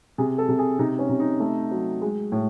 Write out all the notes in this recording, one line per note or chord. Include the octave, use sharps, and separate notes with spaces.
C3 G#4
A4
C3
G#4
C3 D#4
C#4
C3
D#4
A3
F#3
G#3
A2